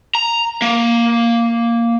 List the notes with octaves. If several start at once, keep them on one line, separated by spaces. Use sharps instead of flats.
A#5
A#3